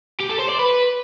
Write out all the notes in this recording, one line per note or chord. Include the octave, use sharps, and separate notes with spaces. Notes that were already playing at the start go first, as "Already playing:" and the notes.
G4
A4
C5
D5
B4